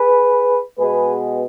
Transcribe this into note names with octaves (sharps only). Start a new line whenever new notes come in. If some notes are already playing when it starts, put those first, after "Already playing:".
Already playing: G#4 B4
B2 G#3 B3 G#4 B4